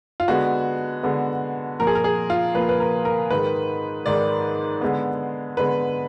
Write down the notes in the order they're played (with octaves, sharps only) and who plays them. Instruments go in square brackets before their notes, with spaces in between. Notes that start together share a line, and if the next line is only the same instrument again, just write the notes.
[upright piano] F4
D3 G#3 B3 F#4
D3 G#3 B3
A#2 F3 A#3 A#4
G#4
A#4
G#4
F4
A#2 F3 A#3 B4
B4
A#4
A#4
G#2 D#3 G#3 B4
G#2 D#3 G#3 D5
D3 G#3 B3
D3 G#3 B3 B4